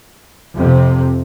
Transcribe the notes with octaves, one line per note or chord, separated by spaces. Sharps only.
F2 C3